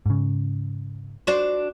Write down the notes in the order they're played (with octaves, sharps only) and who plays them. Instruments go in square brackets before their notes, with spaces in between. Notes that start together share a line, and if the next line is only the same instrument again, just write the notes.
[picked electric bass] G#2 C#3
[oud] D4 F#4 C5